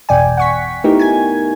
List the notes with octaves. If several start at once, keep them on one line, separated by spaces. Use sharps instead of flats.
G1 E2 B2 D5 G5 G#5
F#5 C#6 B6
A3 B3 D#4 E4 G4 A#4
G#5 G#6